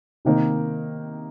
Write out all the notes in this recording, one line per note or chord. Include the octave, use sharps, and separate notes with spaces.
C3 D#3 A#3 D#4 A#4